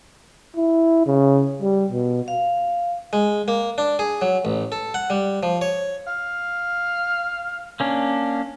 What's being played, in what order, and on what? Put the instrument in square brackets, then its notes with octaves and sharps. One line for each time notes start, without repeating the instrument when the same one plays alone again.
[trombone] E4
C#3
G3
B2
[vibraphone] F5
[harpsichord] G#3
A#3
D4
G#4
F#3
A1
A4
F#5
G3
F3
C#5
[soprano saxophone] F5
[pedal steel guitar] A#3 C#4 D4